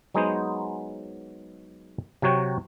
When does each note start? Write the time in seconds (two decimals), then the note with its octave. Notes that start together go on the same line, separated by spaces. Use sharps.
0.14 F#3 G#3 B3 D#4 G#4 C5
2.22 C3 F#3 F#4 C#5 G5 A#5